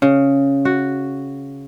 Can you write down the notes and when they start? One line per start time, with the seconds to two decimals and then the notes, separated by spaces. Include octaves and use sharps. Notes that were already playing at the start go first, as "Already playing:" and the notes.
0.02 C#3
0.65 F#4